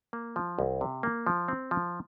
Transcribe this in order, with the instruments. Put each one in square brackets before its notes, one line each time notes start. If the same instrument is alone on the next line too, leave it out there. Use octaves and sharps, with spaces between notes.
[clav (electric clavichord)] A#3
F3
C2
C3
A#3
F3
C4
F3